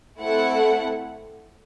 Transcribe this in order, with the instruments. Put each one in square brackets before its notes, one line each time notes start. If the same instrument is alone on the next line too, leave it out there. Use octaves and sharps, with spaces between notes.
[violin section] A3 C4 E4 A4 F#5